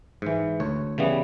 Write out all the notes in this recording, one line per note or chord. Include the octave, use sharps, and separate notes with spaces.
G#2 E3
D2 C#5
C#3 E3 G3 B3